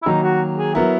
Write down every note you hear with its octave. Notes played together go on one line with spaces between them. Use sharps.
E4
D#3 F#3 A#3 D#4
F#4
G#4
F#3 B3 E4 A#4